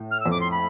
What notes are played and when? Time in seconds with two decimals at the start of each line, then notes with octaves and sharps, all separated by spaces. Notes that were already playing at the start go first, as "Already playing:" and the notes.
Already playing: A2
0.11 F6
0.20 E6
0.26 F2
0.31 D6
0.40 C6
0.51 B5